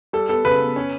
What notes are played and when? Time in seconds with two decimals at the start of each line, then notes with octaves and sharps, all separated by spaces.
0.13 G3 A4
0.29 B3 A4
0.45 C#3 B4
0.60 B3
0.76 C#4